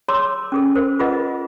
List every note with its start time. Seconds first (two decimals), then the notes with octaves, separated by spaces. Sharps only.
0.08 G#4 C#5 A#5 C6 D6 E6
0.52 C#4 G#4 A4
0.75 A#4 C5
0.99 F4 G#4 B4 D#5 F#5